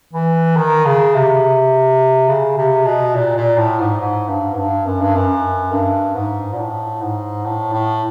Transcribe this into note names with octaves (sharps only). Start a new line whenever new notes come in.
E3
D#3
C#3
C3
C#3
C3
B2
A#2
A#2
A2
G#2
G#2
G2
G#2
G2
F#2
G2
F#2
G2
G#2
A#2
A2
G#2
A2
A2